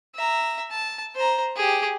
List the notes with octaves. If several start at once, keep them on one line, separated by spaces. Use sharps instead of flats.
E5 A#5
A5
C5 A#5
G4 G#4